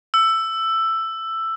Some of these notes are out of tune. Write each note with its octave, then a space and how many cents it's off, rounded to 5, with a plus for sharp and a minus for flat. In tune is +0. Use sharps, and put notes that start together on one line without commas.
E6 +10